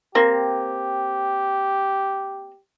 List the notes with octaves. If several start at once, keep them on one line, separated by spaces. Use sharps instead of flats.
A#3 C4 G4